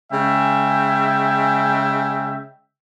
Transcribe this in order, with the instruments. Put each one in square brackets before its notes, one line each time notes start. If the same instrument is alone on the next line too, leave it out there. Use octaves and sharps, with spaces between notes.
[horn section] C#3 G#3 E5 G5